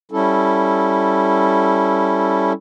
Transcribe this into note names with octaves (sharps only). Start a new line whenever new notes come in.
G3 C#4 E4 A4